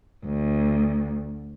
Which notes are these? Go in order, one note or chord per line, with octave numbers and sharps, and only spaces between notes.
D2